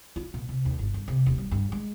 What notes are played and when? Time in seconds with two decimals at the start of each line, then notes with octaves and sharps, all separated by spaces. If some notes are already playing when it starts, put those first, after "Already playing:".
0.16 F4
0.34 A#2
0.49 C3
0.65 D#2
0.79 G1
0.94 G2
1.08 C3
1.26 D#1
1.38 G3
1.52 G2
1.72 G#3